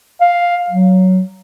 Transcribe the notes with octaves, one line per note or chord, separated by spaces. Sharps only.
F5
F#3